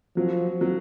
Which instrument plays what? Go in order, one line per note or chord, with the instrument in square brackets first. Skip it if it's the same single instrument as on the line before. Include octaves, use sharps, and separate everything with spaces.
[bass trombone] F3 [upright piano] F#3
[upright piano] F#3